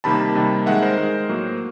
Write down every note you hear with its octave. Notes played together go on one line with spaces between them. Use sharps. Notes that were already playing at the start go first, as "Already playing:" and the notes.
C3 D#3 G3 A#3 A5 B5
C3 D#3 G3 A#3
D#3 G#3 E5 F#5
A#4 C5
D#3 G#3
A2 F#3 A#3